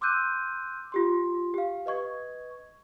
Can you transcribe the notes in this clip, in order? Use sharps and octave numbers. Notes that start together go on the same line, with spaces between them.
C6 D6 E6 F#6 G6 D#7
F4 G4 C6
G4 F5
B4 D#5 C#6 G#6